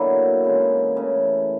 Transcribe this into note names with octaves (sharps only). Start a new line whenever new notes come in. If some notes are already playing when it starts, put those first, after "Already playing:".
Already playing: B2 D3 F#3 A#3 E4
C#3 E3 G#3
C#3 E3 A3